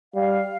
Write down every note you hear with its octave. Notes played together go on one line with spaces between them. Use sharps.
G3 F5